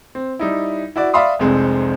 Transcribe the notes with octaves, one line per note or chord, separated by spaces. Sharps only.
C4
G3 D#4 E4
E4 F#4 D5
D5 E5 F5 B5 C6 D#6
F1 C2 F2 G#3 C4 C5